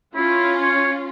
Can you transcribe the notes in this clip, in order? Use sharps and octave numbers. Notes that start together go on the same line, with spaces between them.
C#4 E4 F4
C#5